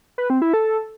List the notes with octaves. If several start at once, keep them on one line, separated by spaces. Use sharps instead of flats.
B4
C4
E4
A4